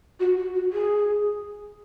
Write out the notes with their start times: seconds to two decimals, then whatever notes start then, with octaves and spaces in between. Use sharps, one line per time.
0.20 F#4
0.37 F#4
0.55 F#4
0.72 G#4